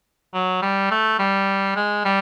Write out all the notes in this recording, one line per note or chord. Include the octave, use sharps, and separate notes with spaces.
F#3
G3
A3
G3
G#3
G3